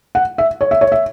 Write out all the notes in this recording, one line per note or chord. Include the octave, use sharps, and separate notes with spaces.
F#5
E5
C#5
E5
C#5
E5